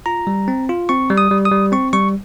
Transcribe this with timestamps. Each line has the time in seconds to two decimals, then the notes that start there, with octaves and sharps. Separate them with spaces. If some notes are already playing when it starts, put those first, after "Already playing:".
0.06 F4 A#5
0.27 G3
0.48 C4
0.69 F4
0.89 C4 C#6
1.10 G3
1.18 D#6
1.31 G3
1.45 D#6
1.52 G3
1.72 C4 C#6
1.93 G3 C#6